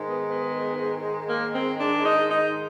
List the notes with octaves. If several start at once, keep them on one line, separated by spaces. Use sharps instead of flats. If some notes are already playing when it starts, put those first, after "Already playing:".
Already playing: G#2 D#3 G#3
B3
B3
A#3
C4
D4
D#4
D#4